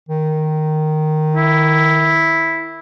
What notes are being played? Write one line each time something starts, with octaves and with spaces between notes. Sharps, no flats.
D#3
E4